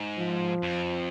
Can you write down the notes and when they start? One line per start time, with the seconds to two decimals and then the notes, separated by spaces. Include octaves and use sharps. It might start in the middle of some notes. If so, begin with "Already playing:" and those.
Already playing: G#2
0.18 F3
0.63 F2